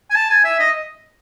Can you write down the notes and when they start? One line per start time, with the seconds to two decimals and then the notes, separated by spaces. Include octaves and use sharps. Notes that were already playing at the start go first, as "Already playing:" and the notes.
0.11 G#5
0.15 A5
0.30 G#5
0.45 E5
0.59 D#5